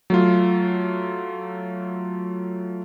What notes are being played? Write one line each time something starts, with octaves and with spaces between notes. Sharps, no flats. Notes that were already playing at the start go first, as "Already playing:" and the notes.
F#3 A3 F4